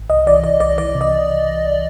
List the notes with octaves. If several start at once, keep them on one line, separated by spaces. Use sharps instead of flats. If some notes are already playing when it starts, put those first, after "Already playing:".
Already playing: G#1
C2 D#5
E3 D5
C2 D5
C2 D5
E3 D5
C3
D#5